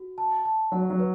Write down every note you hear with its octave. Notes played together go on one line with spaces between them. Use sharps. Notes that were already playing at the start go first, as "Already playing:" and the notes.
Already playing: F#4
A5
A5
F#3 F#5
F#3
B4